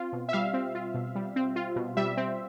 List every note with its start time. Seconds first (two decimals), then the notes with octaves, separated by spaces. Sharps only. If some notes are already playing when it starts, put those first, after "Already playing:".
Already playing: C4 F4
0.13 B2
0.29 E5
0.33 G3 F5
0.54 C4
0.75 F4
0.94 B2
1.15 G3
1.36 C4
1.56 F4
1.76 B2
1.97 G3 E5
2.17 C4